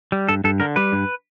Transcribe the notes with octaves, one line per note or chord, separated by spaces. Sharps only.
G3
G2 A4
G2 A4
D3 A#4
G3 B4
G2